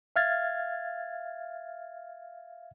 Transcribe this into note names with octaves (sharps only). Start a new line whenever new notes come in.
E5 F5 F6 G#6 A6